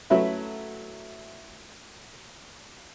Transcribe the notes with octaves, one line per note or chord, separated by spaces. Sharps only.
F#3 A3 C#4 E4 B4 E5